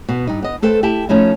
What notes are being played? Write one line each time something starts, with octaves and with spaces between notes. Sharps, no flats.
B2 B3
G2 D#4
B3 D#5
A3 A4 B4 C5 G5
E4 G4 G5 A5
F3 A3 C#4 D#4 E4